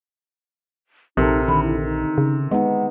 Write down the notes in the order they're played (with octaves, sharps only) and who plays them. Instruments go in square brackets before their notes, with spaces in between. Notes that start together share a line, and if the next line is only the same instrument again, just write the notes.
[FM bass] A#1 [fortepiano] C3 [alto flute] D#4 [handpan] A4 A#4
[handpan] D3 D#3 [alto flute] B5
[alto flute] E4
D#4
[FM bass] C#3
[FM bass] G#3 [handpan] B3 D#4 [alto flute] F#5